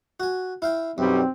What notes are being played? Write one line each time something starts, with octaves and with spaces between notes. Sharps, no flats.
F#4 G#5
E4 F5 G5
B1 F#2 G3 C4